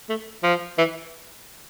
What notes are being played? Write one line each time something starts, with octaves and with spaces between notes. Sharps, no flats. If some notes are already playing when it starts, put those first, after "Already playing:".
A3
F3
E3